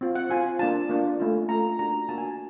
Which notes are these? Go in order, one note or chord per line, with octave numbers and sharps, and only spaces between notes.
C4 F4
F#5
C4 F4 G#5
A#3 D4 F4 A5
A#3 D4 F4
A3 C#4 F4
A3 C#4 F4 A#5
A#3 D4 F#4 A#5
A#3 D4 F#4 A5
G#5
A5